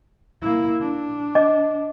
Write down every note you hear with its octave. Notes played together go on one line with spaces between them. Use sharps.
A#3 E4
D4
D#5 D6